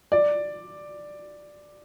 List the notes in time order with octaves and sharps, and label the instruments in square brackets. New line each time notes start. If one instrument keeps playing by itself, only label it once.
[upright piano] D5